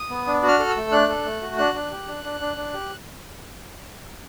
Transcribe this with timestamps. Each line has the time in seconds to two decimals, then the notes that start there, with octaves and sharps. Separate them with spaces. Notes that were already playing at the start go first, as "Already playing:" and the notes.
Already playing: D#6
0.10 B3
0.27 D4
0.42 F#4
0.48 F6
0.59 A4
0.71 E6
0.76 A3
0.92 D4 F#6
1.09 A4
1.25 A3
1.41 F#4
1.57 D4 F#6
1.74 D4
1.92 G4
2.08 D4
2.24 D4
2.40 D4
2.57 D4
2.73 G4